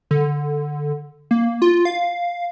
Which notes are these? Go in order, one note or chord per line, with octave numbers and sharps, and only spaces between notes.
D3
A#3
F4
F5